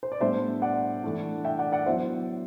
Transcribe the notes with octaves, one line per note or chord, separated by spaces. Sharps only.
C5
D5
A2 G3 B3 D4 C5 E5
D5 F#5
E3 A3 D4
E5 G5
D5 F#5
D5 F#5
F#3 B3 E4 C5 E5